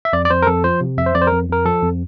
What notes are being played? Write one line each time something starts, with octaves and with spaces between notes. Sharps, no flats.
E5
F2 D5
D5
F2 C5
A#4
F2 A4
F3 C5
C3
F2 E5
C5
F2 D5
C5
F2 A#4
F2 A#4
F3 A4
F2